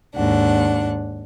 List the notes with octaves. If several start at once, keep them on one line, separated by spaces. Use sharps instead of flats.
D#2 G#2 D4 F#5